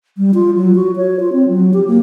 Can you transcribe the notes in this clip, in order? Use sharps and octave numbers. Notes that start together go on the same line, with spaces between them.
G3
F4
F#3
F#4
C#5
F4
C4
F#3
G4
A#3